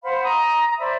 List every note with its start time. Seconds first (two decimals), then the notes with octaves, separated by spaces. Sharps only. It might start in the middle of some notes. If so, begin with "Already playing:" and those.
0.03 C5 F5 F#5 B5
0.22 A#5 D#6
0.63 A#5
0.78 C5 D5 E5 B5